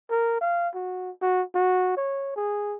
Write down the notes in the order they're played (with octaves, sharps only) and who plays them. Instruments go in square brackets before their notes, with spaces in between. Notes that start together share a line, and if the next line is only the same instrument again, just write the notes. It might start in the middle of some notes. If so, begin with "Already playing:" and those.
[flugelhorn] A#4
F5
F#4
F#4
F#4
C#5
G#4